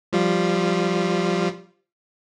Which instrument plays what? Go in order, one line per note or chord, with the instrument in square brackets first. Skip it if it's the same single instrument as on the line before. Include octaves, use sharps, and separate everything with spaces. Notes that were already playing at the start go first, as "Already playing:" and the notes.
[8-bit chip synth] F3 G3 F4